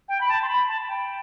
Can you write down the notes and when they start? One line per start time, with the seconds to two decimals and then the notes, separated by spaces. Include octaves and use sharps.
0.08 G5
0.20 B5
0.28 A5
0.42 C6
0.48 B5
0.68 A5
0.81 A5
0.88 G5